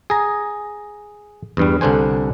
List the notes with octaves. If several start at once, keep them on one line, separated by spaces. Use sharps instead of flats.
G#4 A#5
E2 G2 G3
C2 D3 D4 C5 G#5